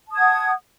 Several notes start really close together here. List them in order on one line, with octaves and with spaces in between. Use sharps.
A5 D#6 G#6 F#5